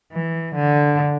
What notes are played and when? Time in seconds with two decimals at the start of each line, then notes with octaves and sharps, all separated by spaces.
0.12 E3
0.55 D3